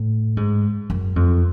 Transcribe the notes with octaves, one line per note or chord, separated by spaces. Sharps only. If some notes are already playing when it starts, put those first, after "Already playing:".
Already playing: A2
G#2
F#2
F2